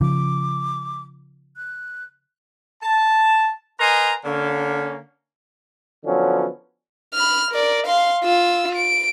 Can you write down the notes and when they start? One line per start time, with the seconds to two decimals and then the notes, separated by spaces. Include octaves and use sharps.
0.01 C#3 F3 D6
1.57 F#6
2.83 A5
3.80 A#4 B4 D#5 G#5 A#5 C6
4.24 D3 A#3 C#4
6.05 D3 F3 F#3 B3 C#4
7.14 B5 F6
7.51 A#4 D5
7.87 F5 C6
8.24 F4 E6
8.75 D7